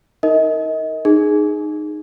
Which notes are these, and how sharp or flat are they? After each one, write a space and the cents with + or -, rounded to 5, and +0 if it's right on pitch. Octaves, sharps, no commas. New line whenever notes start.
D#4 +30 A#4 -20 D#5 +30
D#4 -20 G#4 +0